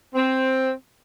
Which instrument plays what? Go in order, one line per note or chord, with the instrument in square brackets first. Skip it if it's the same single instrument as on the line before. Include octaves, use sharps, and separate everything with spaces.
[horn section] C4